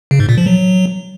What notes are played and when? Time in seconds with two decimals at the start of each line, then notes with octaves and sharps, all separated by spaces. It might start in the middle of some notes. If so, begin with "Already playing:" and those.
0.11 C#3
0.20 G#2
0.29 A#2
0.38 F3
0.46 F#3